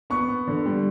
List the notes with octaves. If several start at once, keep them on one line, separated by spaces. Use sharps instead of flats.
B3 C#6
B3
D3
G3